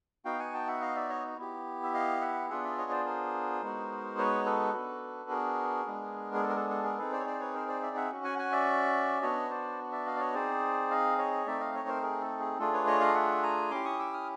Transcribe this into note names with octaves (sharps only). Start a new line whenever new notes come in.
B3 D#4 F#4 F5 G5
F#5 G#5
G5 A5
E5 F#5
D#5 F5
D5 E5
C#5 D#5
B3 E4 G4
E5
D#5 F5
E5 F#5
B3 D4 F4 G#4 E5 F#5
D5 E5
C#5 D#5
C5 D5
A#4 C5
G#3 B3 D#4 F#4
B4 C#5
A4 B4
B3 D4 F#4
G#4 A#4
G#3 B3 D4
G#4
A4
A#4
A4
A4
G#4 A#4
C4 D#4 G#4 A4 B4
C5 D5
C#5
C5 D5
B4 C#5
A#4 C5
C5 D5
D5 E5
E5 F#5
C#4 F#4
F#5 G#5
F#5 G#5
D5 E5
B3 D4 F#4 C#5 D#5
C5 D5
D5 E5
D#5 F5
D5
C#5 D#5
C4 D#4 G#4 C5 D5
D#5 F5
C#5 D#5
A3 C4 D#4 D5 E5
D#5 F5
C#5 D#5
A#4 C5
G#4 A#4
A4
G#4
A3 D4 F4 G#4 A4
B4 C#5
C#5 D#5
D#5 F5
E5 F#5
G#5 A#5
C#4 E4 G4 C6 D6
C#6 D#6
D6 E6
D#6 F6